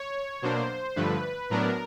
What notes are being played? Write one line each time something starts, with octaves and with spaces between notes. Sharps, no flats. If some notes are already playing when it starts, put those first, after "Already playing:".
Already playing: C#5
B2 F#3 A#3 D4 C5
G2 D3 F3 A3 B4
A2 F#3 B3 D4 A#4